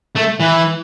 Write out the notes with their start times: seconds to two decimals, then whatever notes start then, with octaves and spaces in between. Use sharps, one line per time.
0.16 A3
0.40 E3